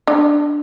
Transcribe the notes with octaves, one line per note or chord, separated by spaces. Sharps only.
D4